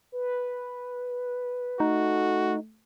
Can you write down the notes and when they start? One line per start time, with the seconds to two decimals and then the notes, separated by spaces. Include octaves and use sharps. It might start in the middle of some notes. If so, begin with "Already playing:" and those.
0.12 B4
1.80 A3 D#4 F#4